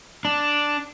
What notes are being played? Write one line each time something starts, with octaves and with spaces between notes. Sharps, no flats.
D4